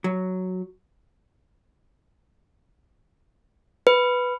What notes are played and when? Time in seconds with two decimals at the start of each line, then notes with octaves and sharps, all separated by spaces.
0.04 F#3
3.87 B4